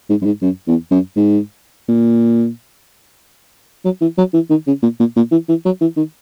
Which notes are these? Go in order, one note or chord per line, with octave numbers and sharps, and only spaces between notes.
G#2
F#2
G#2
F#2
E2
F#2
G#2
A#2
F#3
E3
F#3
E3
D#3
C#3
A#2
A#2
A#2
E3
E3
F#3
E3
D#3